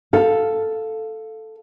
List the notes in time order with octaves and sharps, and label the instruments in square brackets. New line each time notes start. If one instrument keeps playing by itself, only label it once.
[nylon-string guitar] A4 F5